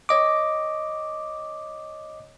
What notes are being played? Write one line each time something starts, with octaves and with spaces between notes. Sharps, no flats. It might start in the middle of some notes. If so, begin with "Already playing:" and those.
C#5 D#5 D6